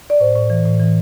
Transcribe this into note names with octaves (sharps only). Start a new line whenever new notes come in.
D5
A2 C5
A2
E3
A2
E3